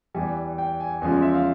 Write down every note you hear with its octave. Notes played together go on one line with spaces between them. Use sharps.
E2 E3 G3 G#5
G5
G#5
E2 C#3 F3 G#3 G#5
E5
F5